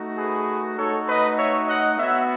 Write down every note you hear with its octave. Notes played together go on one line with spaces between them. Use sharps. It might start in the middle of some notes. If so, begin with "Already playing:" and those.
Already playing: A3 D#4 F#4
G#4 B4
A3 D#4 F#4 A4 C#5
B4 D#5
C#5 E5
D#5 F#5
B3 F#4 C#5 E5